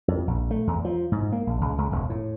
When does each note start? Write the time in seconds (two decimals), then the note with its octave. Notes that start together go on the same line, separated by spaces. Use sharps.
0.08 F2
0.28 A#1
0.51 A3
0.67 E2
0.85 F3
1.12 G#2
1.32 A#3
1.47 A#1
1.61 C#2
1.78 C#2
1.92 E1
2.10 A2